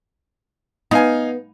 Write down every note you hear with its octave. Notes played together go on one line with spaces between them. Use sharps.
B3 D#4 F5 G#5